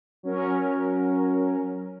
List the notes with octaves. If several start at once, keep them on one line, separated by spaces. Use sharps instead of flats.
F#3 C#4 A#4